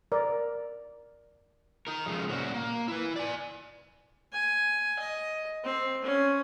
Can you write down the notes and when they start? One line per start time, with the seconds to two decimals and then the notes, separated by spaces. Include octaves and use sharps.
0.12 A#4 D5
1.87 D#4 A#4
2.06 F2 C#3 F3 G#3 A3
2.29 A#2 C#4 F#4
2.54 A#3
2.88 E4 B4
3.16 D5 G#5
4.33 G#5
4.99 D#5
5.64 C4
6.05 C#4